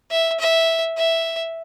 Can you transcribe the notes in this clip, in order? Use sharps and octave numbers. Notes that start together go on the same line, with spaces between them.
E5
E5
E5